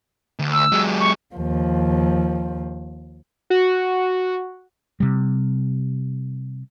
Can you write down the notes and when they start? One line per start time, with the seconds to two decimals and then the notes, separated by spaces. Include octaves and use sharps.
0.39 D2
0.53 E6
0.72 F#3 G#3
1.00 C#6
1.34 D#2 F3
3.50 F#4
5.00 C3 G3